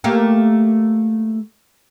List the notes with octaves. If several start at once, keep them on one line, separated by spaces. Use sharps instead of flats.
A3 A#3 G4